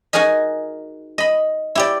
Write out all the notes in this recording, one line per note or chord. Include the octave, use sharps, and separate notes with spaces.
D#4 F#4 G#4 A#4 D#5
D#5 B5
E4 G4 D5